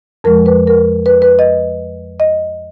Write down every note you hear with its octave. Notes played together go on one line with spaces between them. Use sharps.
F2 F3 G#3 A#4
B4
A#4
B4
B4
D#5
D#5